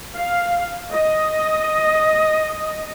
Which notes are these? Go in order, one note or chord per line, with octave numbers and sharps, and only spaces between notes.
F5
D#5